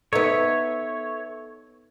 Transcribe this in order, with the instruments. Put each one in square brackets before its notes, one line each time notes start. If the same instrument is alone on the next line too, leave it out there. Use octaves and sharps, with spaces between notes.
[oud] B3 D#4 [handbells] A4 E5 [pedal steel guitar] C#5